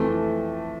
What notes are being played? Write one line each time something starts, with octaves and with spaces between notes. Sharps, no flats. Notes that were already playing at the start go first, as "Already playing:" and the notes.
Already playing: F2 E3 A3